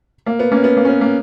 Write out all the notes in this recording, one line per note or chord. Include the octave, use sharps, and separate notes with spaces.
A#3
B3
A#3 C#4
B3
A#3
C#4
B3
A#3